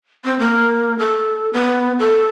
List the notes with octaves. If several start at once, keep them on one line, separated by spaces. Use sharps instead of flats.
C4
A#3
A4
B3
A4